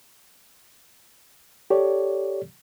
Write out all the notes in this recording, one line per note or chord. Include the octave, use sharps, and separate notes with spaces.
G4 A4 C#5 D5